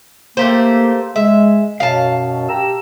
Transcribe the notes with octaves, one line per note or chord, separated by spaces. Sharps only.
A3 A#3 G4 C5
G#3 E5
F#2 B2 F5 A5
G4 A#5 E6